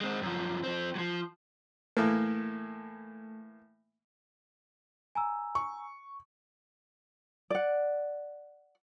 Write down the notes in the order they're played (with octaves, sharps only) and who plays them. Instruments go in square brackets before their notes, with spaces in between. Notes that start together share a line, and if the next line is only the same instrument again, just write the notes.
[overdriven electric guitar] G#3 C4
F#2 F3
F3 C4
F3 F#3
[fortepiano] A2 E3 A#3 [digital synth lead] A3
[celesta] G#5 A#5 E6
[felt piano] C#6
[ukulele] D5 F#5